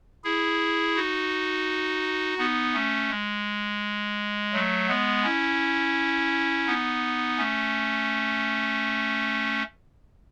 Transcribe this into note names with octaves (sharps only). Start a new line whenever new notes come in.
E4 G#4
D#4 F#4
B3 D#4
A3 C#4
G#3
F#3 A3
G#3 B3
C#4 E4
B3 D#4
A3 C#4